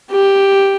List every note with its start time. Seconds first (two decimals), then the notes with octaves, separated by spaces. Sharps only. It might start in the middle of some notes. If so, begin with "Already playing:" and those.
0.11 G4